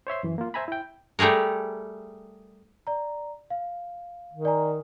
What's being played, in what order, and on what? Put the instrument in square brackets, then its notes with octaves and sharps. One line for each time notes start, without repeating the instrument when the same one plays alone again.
[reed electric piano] C5 C#5 E5 C6
F#2 E3
A#3 F4
C5 E5 G#5 A#5 B5
E4 G5
[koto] G3 A3 G4 G#4 A#4
[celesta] D5 A#5
F5
[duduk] D#3
[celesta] D5 G#5 A#5